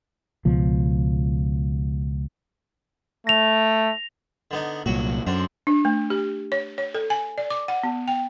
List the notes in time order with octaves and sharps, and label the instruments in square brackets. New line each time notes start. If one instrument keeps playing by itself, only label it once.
[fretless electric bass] C#2 B2 F3
[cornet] A3 [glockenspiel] A#6 F7
[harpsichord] D3 B3 D#4
[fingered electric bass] C2 A#2 [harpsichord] F#3 F#4
[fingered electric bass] F#2 [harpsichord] D3 C4
[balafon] D4
A3
G4
C#5
C#5
A4
G#5
D5
D6
F#5
B3
G5